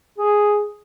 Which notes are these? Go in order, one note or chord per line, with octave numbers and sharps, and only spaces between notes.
G#4